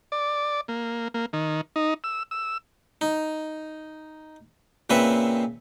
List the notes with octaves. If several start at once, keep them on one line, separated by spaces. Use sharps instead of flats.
D5
A#3
A#3
D#3
D#4
E6
E6
D#4
A#2 C#3 C4 B4 E5